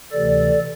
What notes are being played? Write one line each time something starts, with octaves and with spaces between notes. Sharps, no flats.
D2 C3 E3 A4 D5